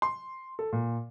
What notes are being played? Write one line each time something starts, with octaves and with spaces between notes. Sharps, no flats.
C6
A4
A#2